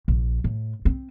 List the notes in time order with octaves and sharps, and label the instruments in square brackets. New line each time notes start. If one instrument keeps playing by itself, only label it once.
[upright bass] A#1
A2
C4